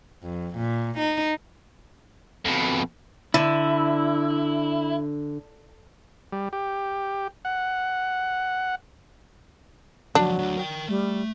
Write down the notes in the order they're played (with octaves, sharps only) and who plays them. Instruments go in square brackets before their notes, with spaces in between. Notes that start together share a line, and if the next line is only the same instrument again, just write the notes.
[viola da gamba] F2
A#2
D#4
[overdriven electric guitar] F2 B2
[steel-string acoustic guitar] D3 [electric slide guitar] E4
[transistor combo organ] G3
G4
F#5
[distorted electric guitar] D2 F3 [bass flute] F#3 [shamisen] D4
[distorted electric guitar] D2 D3
A#4 G5
[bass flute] G3 [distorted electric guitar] A3